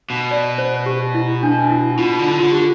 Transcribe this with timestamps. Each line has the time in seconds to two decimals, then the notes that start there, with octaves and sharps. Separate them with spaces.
0.10 B2
0.31 D5
0.58 C5
0.86 G4
1.14 E4
1.43 D4
1.70 E4
1.98 B2 F4
2.19 D3
2.40 D3 F4
2.52 G4